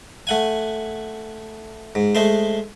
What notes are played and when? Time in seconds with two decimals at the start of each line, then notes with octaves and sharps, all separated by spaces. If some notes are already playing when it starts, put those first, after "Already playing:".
0.27 A3 F#5 G#5
1.95 G#2
2.15 G#3 A3 C5